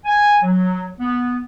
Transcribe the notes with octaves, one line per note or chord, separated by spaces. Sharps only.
G#5
F#3
B3